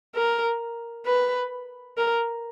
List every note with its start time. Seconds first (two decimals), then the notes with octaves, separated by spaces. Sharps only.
0.15 A#4
1.06 B4
1.98 A#4